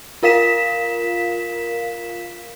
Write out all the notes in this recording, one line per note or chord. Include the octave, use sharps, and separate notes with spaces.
F4 A#4 F5 B6 E7